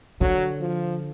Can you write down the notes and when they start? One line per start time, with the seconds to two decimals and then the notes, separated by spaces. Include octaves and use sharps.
0.21 D3 F#3
0.60 F3